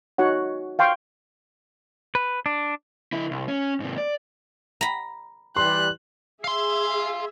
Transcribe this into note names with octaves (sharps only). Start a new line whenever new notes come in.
D#4 F#4 C#5 F#5
F5 G5 C6 C#6
B4
D4
D3 E4
C2
C#4
G#2 C3
D5
A#5 B5
E3 G3 C6 F#6
G#4 E5 F5 C6